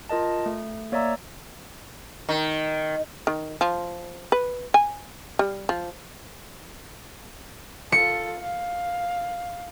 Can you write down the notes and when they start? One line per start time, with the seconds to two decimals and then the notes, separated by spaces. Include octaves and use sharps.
0.09 F4 A#4 D#5 A5
0.46 A3
0.92 A#3 C#5 D5 E5 A#5 E6
2.29 D#3
3.27 D#3
3.61 F3
4.32 B4
4.74 G#5
5.39 G3
5.69 F3
7.92 F4 A4 C#7
8.40 F5